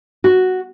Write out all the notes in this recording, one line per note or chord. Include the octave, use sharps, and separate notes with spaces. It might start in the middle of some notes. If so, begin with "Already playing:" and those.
F#4